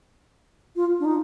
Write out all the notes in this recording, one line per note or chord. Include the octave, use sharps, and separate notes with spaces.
F4
D4
D#4